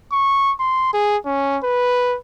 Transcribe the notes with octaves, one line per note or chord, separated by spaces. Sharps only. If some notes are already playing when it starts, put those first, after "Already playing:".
C#6
C6
G#4
C#4
B4